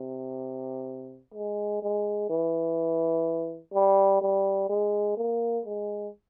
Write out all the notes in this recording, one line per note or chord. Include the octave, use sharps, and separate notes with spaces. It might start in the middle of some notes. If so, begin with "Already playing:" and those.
Already playing: C3
G#3
G#3
E3
G3
G3
G#3
A#3
G#3